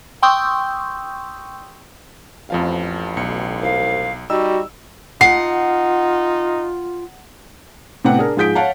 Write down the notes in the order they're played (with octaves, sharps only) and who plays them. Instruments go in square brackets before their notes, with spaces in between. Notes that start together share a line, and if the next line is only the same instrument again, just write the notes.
[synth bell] G5 C6 C#6 D#6 E6 G6
[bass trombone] A1 [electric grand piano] F2 F3 F5
[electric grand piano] B1 C#7
[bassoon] C2 [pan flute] F5
[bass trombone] G3 [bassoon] D#4 [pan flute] F#4 [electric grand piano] E6
[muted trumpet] D#4 [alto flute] F4 [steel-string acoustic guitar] F#5 [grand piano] C7
[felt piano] A2 C3 B3 F#5 G5
D4 G#4 A#4
G#2 F3 G#4 G6 B6 D7
C#5 F5 F#5 A5